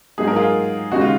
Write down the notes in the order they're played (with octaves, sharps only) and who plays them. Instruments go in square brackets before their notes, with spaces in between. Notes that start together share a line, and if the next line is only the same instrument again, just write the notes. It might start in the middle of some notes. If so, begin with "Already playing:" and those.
[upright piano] G#2 F#3 A#3 D#4 [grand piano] G#4
[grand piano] A#4
F4 G#4
[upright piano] D#2 C#3 G#3 D#4 [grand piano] F#4
[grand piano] F4